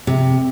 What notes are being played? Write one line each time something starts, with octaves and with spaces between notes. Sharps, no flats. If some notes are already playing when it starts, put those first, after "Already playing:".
C3